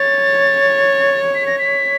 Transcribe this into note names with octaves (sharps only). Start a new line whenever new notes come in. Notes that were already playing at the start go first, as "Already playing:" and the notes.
Already playing: C#5 A6
B6
A#6
B6